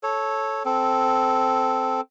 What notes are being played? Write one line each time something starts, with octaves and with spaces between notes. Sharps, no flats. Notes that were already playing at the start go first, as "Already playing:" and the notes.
A4 C#5
C4 A4